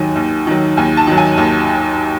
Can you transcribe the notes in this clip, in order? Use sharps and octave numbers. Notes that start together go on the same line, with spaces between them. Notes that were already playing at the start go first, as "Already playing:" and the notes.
Already playing: D#2 D#3 F#3 G#5
D#2
D#3 F#3
D#2 G#5
A5
D#3 F#3
G#5
D#2